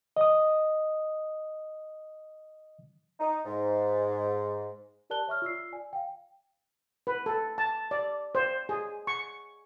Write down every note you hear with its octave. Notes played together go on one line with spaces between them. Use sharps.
D#5 D#6
D#4
G#2
G4 A#4 D5 A5 F#6 G7
C#5 E5 C#6 F6
F4 D5 E6 C7
D5 G#5
F5 G5
B4
A4
A5
D5
C5
G#4
C#6